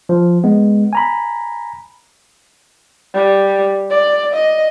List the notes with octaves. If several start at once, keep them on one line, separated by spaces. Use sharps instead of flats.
F3
G#3 B3
G#5 A#5 B5
G3
D5
D#5